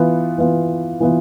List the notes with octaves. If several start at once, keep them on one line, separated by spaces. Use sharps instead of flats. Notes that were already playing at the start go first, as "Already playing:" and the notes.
Already playing: E3 B3 F4
E3 B3 F4
E3 B3 F4